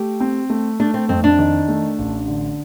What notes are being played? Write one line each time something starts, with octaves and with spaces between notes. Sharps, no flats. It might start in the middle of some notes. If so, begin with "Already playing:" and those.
Already playing: A3 G4
C4
A3
A3 D4
C4
F2 C4
D4
D#3
A3
A1
D3